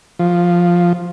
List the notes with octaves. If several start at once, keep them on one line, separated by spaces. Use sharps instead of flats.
F3